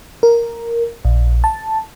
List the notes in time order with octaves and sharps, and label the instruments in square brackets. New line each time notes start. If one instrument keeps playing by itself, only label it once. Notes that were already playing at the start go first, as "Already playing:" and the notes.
[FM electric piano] A#4
A#1
A5